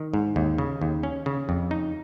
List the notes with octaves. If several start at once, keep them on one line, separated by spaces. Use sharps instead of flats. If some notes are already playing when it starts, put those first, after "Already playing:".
Already playing: D#3
G#2
D#2
C#3
D#2
C#4
C#3
F2
D#4